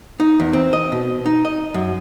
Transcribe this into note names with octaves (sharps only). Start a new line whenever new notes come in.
D#4
E2
C4
D#5
B2
D#4
D#5
F#2